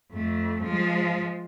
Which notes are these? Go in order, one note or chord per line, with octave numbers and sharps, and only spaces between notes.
F2 A3
F3 G#3